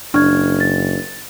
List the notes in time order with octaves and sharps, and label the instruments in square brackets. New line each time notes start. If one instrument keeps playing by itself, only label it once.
[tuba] F#1 [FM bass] D4 [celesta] C#6 F6 G#6
[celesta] A6